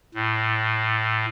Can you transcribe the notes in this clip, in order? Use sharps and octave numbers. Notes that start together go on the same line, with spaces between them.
A2